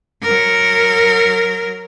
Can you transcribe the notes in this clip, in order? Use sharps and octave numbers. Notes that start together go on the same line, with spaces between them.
F#3 A#4